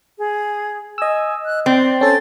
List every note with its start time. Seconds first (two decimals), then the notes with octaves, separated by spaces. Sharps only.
0.18 G#4
0.98 D#5 G#5 E6
1.46 F#6
1.66 C4 D5
2.01 C#4 A4 A6